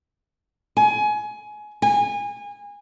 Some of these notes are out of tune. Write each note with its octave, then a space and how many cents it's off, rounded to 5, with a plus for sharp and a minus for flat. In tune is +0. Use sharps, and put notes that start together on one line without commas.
G#5 +20
G#5 -25